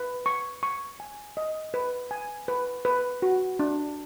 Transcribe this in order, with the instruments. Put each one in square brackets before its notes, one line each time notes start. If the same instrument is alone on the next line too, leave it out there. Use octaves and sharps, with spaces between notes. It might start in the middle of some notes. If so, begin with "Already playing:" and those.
Already playing: [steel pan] B4
C#6
C#6
G#5
D#5
B4
G#5
B4
B4
F#4
D4